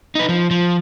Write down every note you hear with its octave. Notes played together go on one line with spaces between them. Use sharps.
D#4 B4
F3
F3